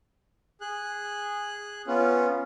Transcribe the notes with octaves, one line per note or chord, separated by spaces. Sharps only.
G#4 F#6
B3 C#4 F4